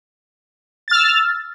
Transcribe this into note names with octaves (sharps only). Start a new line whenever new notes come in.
E6 F6 A6